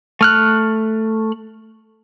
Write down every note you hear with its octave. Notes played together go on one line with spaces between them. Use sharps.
A3 F6 F#6